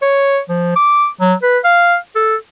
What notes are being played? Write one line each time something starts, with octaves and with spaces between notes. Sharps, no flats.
C#5
F3
D6
F#3
B4
F5
A4